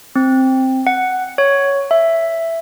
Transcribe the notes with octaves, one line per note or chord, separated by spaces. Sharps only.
C4
F#5
C#5
E5